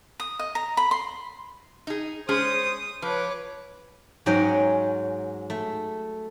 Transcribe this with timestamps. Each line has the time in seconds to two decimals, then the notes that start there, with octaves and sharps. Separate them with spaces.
0.20 D#6
0.39 D#5
0.55 A#5
0.77 B5
0.91 C6
1.87 D#4 G#4
2.29 G#3 C#4 G#4 C5 D#6
3.02 F3 B4 C#5 D6
4.26 G#2 F#3 C#4 D#5 G5 A#5
5.50 A3